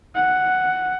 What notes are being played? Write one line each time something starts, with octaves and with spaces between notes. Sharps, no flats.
F#5